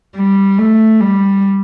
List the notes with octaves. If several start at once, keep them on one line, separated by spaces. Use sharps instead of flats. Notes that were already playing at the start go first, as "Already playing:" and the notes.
G3
A3
G3